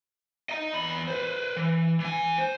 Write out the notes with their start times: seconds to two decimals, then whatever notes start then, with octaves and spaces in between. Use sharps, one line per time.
0.49 D#5 A#5
0.74 E2 B5
1.08 B4 C5
1.56 E3
2.00 E3 G#5
2.38 C5